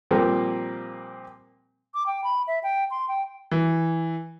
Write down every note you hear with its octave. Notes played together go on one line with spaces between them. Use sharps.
A#2 F3 G3 A#3 C4
D6
G5
B5
E5
G5
C6
G5
E3